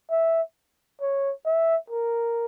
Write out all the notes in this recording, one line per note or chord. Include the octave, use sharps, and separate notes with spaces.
E5
C#5
E5
A#4